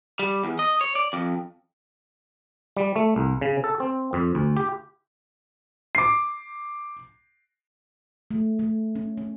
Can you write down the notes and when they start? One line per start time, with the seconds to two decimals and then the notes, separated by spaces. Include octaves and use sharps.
0.19 G3
0.44 E2
0.59 D#5
0.81 C#5
0.95 D5
1.13 F2
2.77 G3
2.96 A3
3.16 C2
3.41 C#3
3.64 A4
3.80 C4
4.13 F2
4.35 D2
4.56 G4
5.95 D6 C7
8.31 A3
8.59 A3
8.96 C#4
9.18 C#4